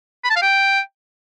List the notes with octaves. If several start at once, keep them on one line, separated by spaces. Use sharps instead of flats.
B5
A5
F5
G5